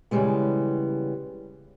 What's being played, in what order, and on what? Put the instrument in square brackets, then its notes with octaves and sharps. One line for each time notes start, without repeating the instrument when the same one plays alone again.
[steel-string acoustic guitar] C#3 E3 F3 G3 G#3 B3